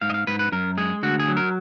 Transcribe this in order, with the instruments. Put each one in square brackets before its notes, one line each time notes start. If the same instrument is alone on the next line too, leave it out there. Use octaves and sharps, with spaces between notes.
[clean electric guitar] G#2 F5
D#5
F5
G#2 B4
B4
F#2 A#4
G#3 G#4
D2 F#4
G#4
F#3
A#4